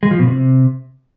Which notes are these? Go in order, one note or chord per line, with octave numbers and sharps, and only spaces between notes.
G#3
F3
B2
C3